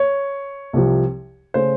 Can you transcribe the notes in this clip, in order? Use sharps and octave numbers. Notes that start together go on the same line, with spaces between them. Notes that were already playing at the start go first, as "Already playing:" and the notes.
Already playing: C#5
C2 C3 F3
C#3 A3 C5